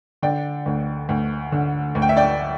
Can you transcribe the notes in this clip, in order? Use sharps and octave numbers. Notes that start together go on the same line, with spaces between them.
D3 D5 G5
D2
D2
D3
D2
G5
E5
D5 G5